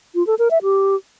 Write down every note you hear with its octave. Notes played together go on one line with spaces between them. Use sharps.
F4
A4
A#4
E5
G4